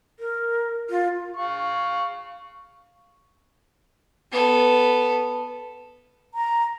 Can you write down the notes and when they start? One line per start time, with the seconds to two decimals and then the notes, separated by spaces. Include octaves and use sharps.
0.20 A#4
0.90 F4
1.35 F5 C#6
4.32 B3 A4
6.34 A#5